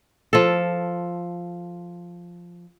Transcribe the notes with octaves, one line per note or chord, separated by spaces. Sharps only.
F3 A4